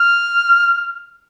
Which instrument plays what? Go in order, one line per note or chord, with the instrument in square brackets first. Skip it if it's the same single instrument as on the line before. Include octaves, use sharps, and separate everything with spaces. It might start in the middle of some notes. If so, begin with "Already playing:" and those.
Already playing: [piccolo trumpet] F6